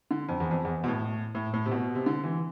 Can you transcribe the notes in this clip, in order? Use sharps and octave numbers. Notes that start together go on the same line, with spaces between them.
D3
F2
E2
F2
E2
B2
A2
A2
A2
C3
B2
C3
D3
E3